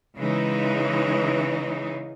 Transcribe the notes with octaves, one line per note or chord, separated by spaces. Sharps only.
C#3 E3 G#3 D#4